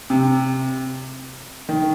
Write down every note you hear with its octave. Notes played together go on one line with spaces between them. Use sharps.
C3
D#3